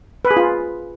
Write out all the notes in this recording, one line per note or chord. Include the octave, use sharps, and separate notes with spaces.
B4
G#4
F4